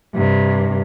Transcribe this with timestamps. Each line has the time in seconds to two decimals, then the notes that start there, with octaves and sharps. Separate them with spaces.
0.15 G2 C3